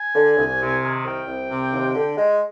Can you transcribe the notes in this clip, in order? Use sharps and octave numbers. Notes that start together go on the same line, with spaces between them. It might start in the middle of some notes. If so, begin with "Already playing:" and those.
Already playing: G#5
D3
C2
C3
D#3
C2 G5
C2
C3
D#2
D3
G#3